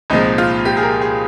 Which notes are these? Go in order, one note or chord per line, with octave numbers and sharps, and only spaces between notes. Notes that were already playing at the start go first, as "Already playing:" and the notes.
C2 A#2 F3 G#3 D#4
F4
G4
G#4
A#4
G#4